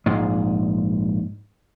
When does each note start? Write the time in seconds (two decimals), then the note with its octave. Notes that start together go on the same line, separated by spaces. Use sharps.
0.06 A#1 G#2 G#3